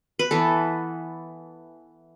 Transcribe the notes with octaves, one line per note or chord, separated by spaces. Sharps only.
B4
E3 B3 A4